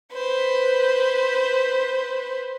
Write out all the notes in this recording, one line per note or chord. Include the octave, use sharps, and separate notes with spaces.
B4 C5